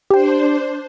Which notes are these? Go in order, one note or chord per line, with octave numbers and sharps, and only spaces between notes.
D4 G4 C5 G5